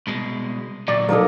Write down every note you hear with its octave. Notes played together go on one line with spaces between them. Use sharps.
C2 B2 G#3
A#2 D3 F#3 D5
B1 A#3 A4 A#4 D#5